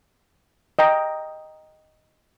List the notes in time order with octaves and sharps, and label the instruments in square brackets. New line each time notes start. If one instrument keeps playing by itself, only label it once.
[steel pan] D#5 G5 A#5